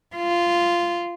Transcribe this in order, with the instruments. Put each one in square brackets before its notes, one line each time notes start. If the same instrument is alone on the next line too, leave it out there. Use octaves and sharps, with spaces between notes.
[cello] F4